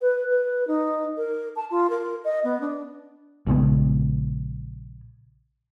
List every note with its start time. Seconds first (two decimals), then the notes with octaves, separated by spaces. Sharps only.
0.01 B4
0.30 B4
0.67 D#4
1.17 A#4
1.56 A5
1.70 F4
1.90 A#4
2.24 D#5
2.44 B3
2.61 D4
3.47 A#1 C#3 G#3 B3